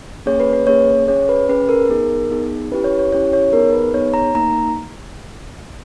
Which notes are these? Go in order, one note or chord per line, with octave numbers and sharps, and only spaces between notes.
A#3 C#4 G#4 C#5
B4
B4
A#3 C#4 G#4 C#5
C#4 G#4 C#5
B4
C#4 G#4 B4
A#4
B3 D#4 G#4
B3 D#4 G#4
C#4 E4 G4 B4
C#5
C#5
C#4 E4 G4 C#5
C#5
B3 D#4 G#4 A#4
B4
B3 D#4 G#4 C#5
A#5
A#3 D#4 A#5